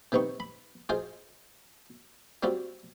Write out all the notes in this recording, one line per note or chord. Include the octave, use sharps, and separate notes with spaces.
C3 D#3 B3 D#4 C#6
B5
F4 G#4 C5 D#5
G3 C4 F4 F#4